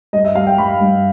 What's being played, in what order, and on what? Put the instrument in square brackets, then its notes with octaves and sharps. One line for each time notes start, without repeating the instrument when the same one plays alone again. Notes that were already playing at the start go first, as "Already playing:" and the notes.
[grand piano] G2 D#5
E5
G3 F5
G5
G2 B5
G2